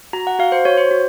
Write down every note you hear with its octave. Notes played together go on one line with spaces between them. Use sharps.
F#4 A#5
F#5
F#4 F5
C5
F#4 C#5
C5
F#4